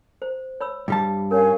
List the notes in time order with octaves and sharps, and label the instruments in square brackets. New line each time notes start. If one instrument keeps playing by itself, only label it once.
[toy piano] C5
C#5 B5 E6
[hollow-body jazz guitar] G2 G3 A5
[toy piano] C#4 A#4 [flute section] C#5 F5 G#5